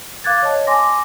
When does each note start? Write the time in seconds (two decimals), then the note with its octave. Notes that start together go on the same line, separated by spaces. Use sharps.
0.24 F5 D6 F#6 G#6 A6
0.42 C#5 D#5 A5
0.67 G#5 C6 D6 A#6